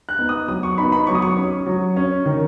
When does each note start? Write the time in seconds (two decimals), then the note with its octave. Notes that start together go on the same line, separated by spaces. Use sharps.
0.09 F#6
0.19 B3 D#4
0.29 D#6
0.48 F#3 D#6
0.63 C#6
0.78 B3 D#4 B5
0.92 B5
1.07 F#3 C#6
1.15 D#6
1.22 C#6
1.37 C#4
1.66 F#3
1.96 C#4
2.26 D#3